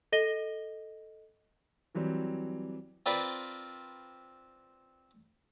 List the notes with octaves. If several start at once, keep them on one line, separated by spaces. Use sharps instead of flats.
A4 D#5 A#6 D#7 G7
E3 F#3 G3 C4
C4 F4 A#4 B4 D5 B5